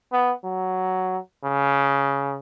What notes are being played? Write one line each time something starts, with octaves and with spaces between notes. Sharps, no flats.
B3
F#3
C#3